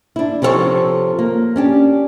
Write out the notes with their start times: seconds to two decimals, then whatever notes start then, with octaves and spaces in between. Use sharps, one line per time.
0.16 D4 E4
0.42 C3 F3 C4 F#4 A4 C#5
1.19 A#3
1.56 C#4 D4 G4